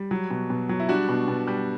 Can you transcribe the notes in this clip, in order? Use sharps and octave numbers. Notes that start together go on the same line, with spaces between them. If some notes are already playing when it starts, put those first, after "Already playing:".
Already playing: G3
F#3
B2
B2
F#3
E4
G3 D4 F#4
B2
B2
G3